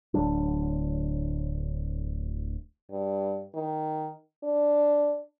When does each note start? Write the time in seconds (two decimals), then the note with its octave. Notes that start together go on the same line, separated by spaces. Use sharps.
0.14 D1 D2 F#3 D4
2.91 G2
3.54 D#3
4.44 D4